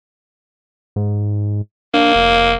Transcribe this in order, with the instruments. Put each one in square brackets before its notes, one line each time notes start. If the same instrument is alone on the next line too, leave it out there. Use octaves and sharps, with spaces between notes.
[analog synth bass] G#2
[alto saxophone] A#3 [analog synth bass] D4
[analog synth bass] F1